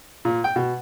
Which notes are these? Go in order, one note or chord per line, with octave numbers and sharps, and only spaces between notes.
A#2
G5
B2